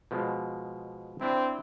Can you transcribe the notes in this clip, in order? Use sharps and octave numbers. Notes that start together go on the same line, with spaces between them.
B2 F3 G#3
C4 D4 E4